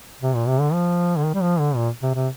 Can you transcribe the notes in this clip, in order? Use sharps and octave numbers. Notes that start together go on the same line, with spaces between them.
C3
A#2
C3
D3
F3
D3
D#3
G3
F3
D3
A#2
C3
C3